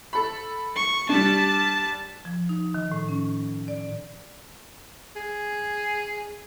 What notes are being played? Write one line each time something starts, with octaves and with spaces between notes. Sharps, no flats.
A4 B5
C#6
G3 D4 A5
F3
D#4
D#3
A2
C#4
D5
G#4